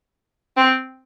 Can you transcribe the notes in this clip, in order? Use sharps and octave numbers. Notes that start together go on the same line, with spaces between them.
C4